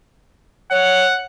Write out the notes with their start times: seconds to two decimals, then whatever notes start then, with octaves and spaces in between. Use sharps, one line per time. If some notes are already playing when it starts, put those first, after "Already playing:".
0.71 C#5 F#5